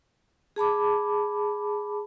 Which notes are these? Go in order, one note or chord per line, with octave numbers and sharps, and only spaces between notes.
G#4 A5 B5 D6